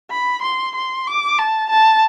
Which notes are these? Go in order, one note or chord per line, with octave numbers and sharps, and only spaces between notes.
B5
C6
C6
D6
A5
A5